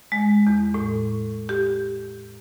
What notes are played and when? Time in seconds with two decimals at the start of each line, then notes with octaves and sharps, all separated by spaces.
0.12 G#3
0.47 E2
0.74 A2
1.49 G4